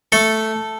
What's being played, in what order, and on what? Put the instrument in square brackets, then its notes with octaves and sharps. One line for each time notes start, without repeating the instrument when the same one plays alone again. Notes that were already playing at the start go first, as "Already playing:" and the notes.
[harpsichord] A3 A4